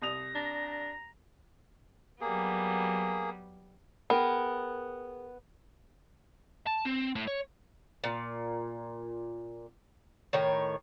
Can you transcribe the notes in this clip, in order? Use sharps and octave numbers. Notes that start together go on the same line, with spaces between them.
C2 D#6 A#6 F7
D4 A#5
F#3 G3 A#3 B3 G#4
B3 G#4 A#4 G5
A5
C4
A2
C#5
A#2
A2 D#3 C#5